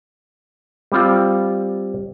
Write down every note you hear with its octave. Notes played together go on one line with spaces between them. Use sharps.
G3 C4 F4